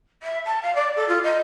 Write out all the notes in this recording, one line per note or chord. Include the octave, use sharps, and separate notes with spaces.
E5
A5
F5
D5
A4
F4
D#5